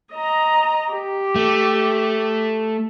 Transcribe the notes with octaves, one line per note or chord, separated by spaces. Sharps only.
D#5 A#5
G4
A3